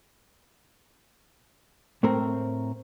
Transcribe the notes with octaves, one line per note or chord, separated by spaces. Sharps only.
A2 A3 C4 A#4